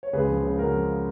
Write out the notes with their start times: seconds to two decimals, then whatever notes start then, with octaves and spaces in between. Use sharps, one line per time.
0.03 C#5
0.13 C#2 G#4 B4
0.29 F3
0.43 C#3
0.58 C#3 F#4 A#4
0.74 F3